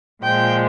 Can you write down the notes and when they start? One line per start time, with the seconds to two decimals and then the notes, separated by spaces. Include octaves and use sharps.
0.23 A#2 F3 G#3 G5